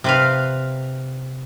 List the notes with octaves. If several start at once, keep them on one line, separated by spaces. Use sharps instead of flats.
C3 B4 F5